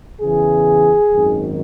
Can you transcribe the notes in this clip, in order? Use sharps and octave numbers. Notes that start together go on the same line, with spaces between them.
E2 C#3 E3 G#4
G#1 F#2 D#3